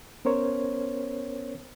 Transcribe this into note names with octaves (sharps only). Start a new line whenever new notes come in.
B3 C#4 A#4 C5 C#5